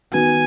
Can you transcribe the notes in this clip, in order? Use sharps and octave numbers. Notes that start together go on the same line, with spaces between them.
D#3 B3 F#4 G#5